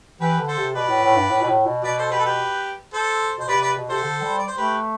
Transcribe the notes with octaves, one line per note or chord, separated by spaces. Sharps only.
E3 G4 B4
D3
A4 C5
C3
B2 B4 D5
A2
A2
G2
A2
B2
A2
B2
B2 B4 D5
A4 C5
G4 B4
A4
G4 B4
A4 C5
B2 C5
C3 B4 D5
B4 D5
B2
C3 A4 C5
D3
G3
D5
C5
A3 G4 B4